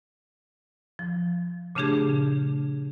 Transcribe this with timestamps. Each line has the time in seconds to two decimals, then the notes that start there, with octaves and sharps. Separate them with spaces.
0.99 F3
1.75 A#2 C#3 A3 D4 G4 G#4